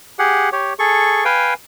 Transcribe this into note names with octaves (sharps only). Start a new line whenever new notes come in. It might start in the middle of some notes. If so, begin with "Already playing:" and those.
G4 G#4 F#5
G4 C#5
G#4 A4 C#6
B4 F5 G5 G#5